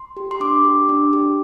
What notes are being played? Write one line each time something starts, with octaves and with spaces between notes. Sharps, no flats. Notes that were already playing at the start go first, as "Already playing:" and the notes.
Already playing: C6
G4
C6
D4 D6
G4
D4
G4